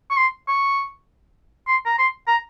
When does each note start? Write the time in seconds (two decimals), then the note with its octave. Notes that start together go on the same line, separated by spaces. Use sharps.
0.10 C#6
0.17 C6
0.48 C#6
1.67 C6
1.86 A#5
1.98 C6
2.27 A#5